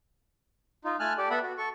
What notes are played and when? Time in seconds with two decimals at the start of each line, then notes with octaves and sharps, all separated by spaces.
0.85 D#4 F4
1.00 A3 G#5 A5 F6 F#6
1.18 G4 A4 D5
1.30 B3 A4 E5 F#5 B5
1.43 F#4
1.58 A4 C#6